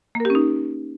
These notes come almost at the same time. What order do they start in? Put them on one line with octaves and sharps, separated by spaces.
A#3 A#4 G4 C#4 D#4